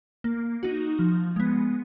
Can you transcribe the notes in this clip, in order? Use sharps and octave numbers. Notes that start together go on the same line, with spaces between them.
A#3
D#4 F#4
F3
G#3 B3